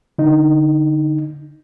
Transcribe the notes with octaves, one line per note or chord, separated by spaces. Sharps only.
D3 D#4